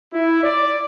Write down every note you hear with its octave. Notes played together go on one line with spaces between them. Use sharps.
E4
D5